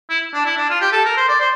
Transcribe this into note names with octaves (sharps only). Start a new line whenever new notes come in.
E4
D4
E4
D4
F4
G4
A4
A#4
C5
D5
C5